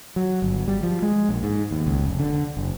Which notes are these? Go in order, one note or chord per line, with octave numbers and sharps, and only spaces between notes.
F#3
G1
G3
F3
G#3
A#1
G#2
D#2
C#2
F1
D3
F#1